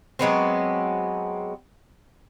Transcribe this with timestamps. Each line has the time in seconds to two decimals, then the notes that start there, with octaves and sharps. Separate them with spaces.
0.19 F#3 G#3 B3 C4